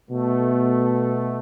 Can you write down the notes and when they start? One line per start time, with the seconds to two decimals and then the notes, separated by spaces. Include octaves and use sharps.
0.10 B2 A3